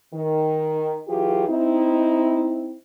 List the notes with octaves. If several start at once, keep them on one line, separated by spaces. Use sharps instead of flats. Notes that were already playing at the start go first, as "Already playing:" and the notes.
D#3
E3 F#3 F4 G4 G#4
C4 D#4 E4